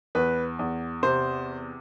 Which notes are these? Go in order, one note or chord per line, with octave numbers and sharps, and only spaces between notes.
E2 B4
E2
C3 C5